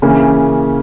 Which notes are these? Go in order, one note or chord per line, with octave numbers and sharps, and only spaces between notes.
C#3 E3 A#3 C#4